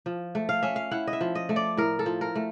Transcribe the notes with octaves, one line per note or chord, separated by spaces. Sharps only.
F3
A3
F5
C#4 E5
F5
E4 F#5
D#5
E5
F3
D#5
A3
D5
A2 A#4
A4
F3
A#4
A3